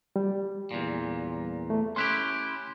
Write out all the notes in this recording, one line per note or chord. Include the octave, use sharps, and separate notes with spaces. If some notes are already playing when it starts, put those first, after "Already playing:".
G3
E2 A#2
A3
C#4 E4 G4 C6 F#6